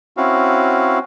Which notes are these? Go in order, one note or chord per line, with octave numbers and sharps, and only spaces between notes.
C4 C#4 E4 F#4 F5